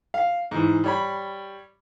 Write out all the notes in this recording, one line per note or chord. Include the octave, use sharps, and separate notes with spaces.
F5
G#2 E3
G3 C#5 B5